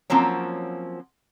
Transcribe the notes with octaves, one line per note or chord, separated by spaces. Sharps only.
F3 F#3 A#3 C4 C#4